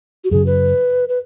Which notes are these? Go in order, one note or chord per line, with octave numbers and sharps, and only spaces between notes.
F#4
F#2 C#3 F#3 G#4
B4
B4